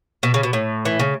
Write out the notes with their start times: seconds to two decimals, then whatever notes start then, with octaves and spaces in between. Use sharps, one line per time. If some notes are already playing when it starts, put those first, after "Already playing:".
0.23 B2
0.34 C#3
0.43 B2
0.53 A2
0.85 E3
0.99 C#3